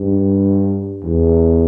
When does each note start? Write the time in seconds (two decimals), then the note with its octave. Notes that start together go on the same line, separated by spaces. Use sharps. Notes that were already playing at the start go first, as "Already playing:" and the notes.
Already playing: G2
1.03 E2